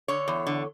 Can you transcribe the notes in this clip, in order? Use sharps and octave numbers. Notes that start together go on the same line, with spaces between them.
D3 C#5
E2
D3